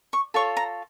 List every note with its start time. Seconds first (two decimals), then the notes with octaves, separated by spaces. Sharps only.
0.13 C#6
0.34 F4 A4 C#5 C#6
0.57 A#5